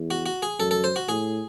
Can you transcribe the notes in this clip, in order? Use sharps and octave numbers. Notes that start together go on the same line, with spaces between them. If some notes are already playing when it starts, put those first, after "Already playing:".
Already playing: E2
F#4
F#4
G#4
F#2 A4
A4
C5
F#4
A2 G#4